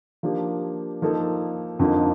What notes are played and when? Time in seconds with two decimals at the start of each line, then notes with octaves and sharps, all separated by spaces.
0.23 F3 A#3 D4 G4
1.02 F3 A#3 D#4 A4
1.79 F2 D3 F3 A#3 D#4